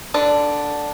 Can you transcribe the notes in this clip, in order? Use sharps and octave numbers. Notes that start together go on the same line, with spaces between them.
D3 D4